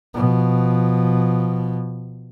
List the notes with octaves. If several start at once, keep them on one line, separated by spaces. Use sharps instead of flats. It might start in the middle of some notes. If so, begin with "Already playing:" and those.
B2 F3